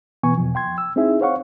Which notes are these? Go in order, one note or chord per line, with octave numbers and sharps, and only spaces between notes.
B2 E3 B3 G#5 C#6
E2 B2 F3
G5 C6 G#6
E6
C4 D#4 E4 G#4 E5
C5 C#5 F5 F#5 C#6